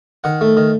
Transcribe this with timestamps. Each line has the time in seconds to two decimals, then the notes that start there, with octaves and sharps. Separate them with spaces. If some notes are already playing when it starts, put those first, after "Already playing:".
0.24 D#3 F#5
0.41 A3
0.57 D#3